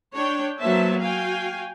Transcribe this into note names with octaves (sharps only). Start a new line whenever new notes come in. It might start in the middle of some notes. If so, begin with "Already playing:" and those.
D4 C#5 G5
F#3 A#3 B3 C5 E5 A5
F#4 F5 G5 G#5